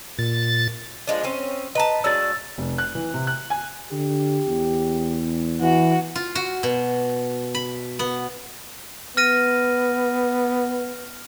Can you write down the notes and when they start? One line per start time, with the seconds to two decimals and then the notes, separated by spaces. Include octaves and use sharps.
0.19 A#2 A6
1.07 F3 G#3 D4
1.23 C4 C#4 G5
1.75 B4 D#5 A5 A#5
2.04 F#3 G#3 D4 E6 A6
2.58 F1
2.78 F#6
2.95 E3
3.14 C3
3.27 F#6
3.50 G#5
3.92 D3 G4
4.48 E2
5.61 E3 F#4
6.16 F4
6.35 F#4
6.63 B2
7.55 B5
7.99 B3
9.17 B3 F6 A#6 D#7